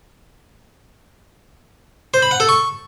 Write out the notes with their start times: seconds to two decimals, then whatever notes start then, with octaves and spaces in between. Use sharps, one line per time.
2.14 C5
2.22 B5
2.31 F#5
2.40 A4
2.49 C#6